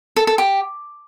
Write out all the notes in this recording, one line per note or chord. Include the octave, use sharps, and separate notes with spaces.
A4
A4
G4